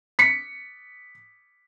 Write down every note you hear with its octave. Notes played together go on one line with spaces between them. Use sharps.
B6 C#7